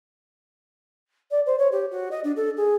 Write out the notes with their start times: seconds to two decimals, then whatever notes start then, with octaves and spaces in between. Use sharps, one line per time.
1.31 D5
1.46 C5
1.59 C#5
1.72 G4
1.91 F#4
2.11 D#5
2.24 D4
2.36 A4
2.57 G#4